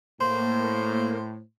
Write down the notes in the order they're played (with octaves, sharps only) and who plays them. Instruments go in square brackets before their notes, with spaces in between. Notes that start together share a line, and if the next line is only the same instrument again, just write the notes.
[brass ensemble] A2 [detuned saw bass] A#3 [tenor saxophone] C5 [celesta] C6